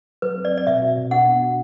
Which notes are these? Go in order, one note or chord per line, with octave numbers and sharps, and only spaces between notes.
F#3 B4
C4
D5
C4
D5
B2 E5
F#4
B2
D4 F#5
B3
F#4